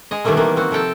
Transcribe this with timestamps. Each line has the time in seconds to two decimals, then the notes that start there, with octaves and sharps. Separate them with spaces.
0.11 G#3 G#4 D#5
0.24 B2 D#3 G3 A3 A#3 C4
0.37 D#3 E3 A#3 B3
0.56 A#3 C4 F#4
0.71 C3 F3 A4 G5 A5